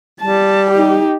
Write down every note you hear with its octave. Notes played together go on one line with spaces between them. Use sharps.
G3 A5
D#4 G4